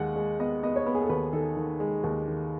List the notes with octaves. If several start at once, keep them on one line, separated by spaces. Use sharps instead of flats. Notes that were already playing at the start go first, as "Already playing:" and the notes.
Already playing: D#2 G#3 F#5
G#3
B3 D#5
B3 D#5
C#5
B3 B4
G#4
A4
D#2 B4
D#3 A4
D#3
G#3
D#2
D#3